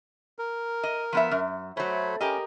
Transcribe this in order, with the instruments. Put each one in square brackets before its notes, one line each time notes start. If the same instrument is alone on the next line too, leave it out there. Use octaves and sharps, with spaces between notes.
[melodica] A#4
[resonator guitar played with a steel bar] D#5
F3 B3 E5
F#2
[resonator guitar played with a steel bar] F#3 A3 [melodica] C5 C#5 B5
[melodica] C#4 [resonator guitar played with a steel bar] G4 A#4 D#5